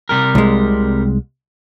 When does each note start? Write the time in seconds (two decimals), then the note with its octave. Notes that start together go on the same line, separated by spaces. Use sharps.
0.09 C3 G3 A#4
0.35 C2 G#3